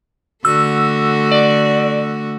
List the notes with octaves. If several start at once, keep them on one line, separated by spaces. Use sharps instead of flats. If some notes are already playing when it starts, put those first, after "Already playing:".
D3 A3 F#4 E6
D5